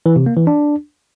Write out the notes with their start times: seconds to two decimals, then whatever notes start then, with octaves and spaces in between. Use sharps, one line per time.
0.06 E3
0.16 C3
0.26 A#3
0.37 E3
0.47 D4